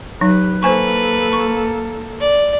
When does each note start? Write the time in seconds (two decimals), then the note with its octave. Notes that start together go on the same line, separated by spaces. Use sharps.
0.21 F#3 D#4 G4 B4
0.63 A#3 A4 B4 C5 G#5 C#6
1.33 C#6
2.20 D5